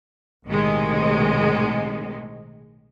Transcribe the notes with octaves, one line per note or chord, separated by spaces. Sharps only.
B1 A2 C3 D#3 G#3